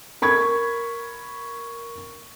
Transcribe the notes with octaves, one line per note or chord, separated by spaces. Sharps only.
A#4 B5 C#6 G#6